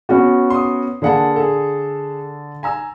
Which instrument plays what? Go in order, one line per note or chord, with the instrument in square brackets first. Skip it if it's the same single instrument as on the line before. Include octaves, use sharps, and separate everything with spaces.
[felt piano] B3 C#4 F#4
[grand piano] C6 D#6
[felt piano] D3 A5 [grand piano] A#3 G#4 F#5
[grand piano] G#4 A4
G#5 A#5 E6